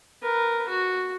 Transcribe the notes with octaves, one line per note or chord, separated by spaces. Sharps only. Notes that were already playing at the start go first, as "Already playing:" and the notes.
A#4 B4
F#4